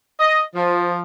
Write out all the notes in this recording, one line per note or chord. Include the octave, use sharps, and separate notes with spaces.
D#5
F3